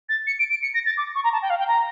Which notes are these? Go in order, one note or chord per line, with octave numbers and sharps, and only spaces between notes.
A6
C#7
D7
D7
C#7
A#6
A6
D6
C#6
A#5
A5
G5
F5
G5
A#5